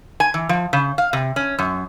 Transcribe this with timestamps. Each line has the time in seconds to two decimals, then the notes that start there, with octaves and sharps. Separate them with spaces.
0.20 G#5
0.34 E3
0.49 F3
0.73 C#3
0.98 F5
1.13 C3
1.36 C#4
1.59 F#2